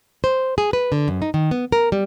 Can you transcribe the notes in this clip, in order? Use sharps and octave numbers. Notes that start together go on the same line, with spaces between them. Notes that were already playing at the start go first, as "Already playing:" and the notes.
C5
G#4
B4
D3
F#2
D#4
D#3
B3
A#4
G3